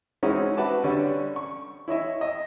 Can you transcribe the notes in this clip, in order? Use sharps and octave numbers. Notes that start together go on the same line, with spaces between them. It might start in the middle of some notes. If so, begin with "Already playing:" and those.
G#3 C4 C#4 D#4 E4 F#4
F#4 B4 E5 A5 D6
D3 G3 C#4
C#6
E4 C#5 D#5 E5
D#5